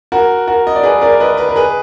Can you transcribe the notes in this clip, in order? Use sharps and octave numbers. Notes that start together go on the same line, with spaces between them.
F#4 A#4
F#4 A#4
D#5
D5
G#4 B4
A#4 D5
B4 D#5
B4 D#5
A#4
G#4 B4